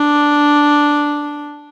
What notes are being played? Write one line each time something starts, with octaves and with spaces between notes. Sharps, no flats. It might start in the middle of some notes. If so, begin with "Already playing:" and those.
Already playing: D4